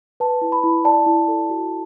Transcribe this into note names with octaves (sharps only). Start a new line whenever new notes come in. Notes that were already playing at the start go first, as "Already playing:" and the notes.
B4 A5
E4
B5
E4
D5 A5
E4
A4
F#4